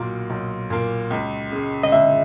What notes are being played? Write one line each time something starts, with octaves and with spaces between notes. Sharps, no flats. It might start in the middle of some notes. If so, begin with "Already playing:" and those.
Already playing: B1 A#2 A#3 F#4
B1
A#2 A#3
C#2
C#3 G#3
D#5
C#2 E5